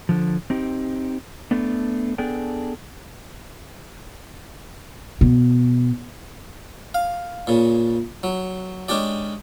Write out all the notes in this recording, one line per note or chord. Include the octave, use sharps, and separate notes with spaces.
D3 F3
C4 D#4 G4
A3 B3 D4
B3 D4 G#4 A4 G5
B2
F5
A#2 C#3
F#3
G#3 C#4 D4 G4 D5